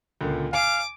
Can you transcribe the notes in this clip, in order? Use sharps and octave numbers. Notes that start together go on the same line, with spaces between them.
C#2 A#2 D3
F5 G#5 D6